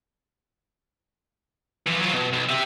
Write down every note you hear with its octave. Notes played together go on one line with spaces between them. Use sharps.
E3 F3
F#3 F4
B2
B1
G4 E5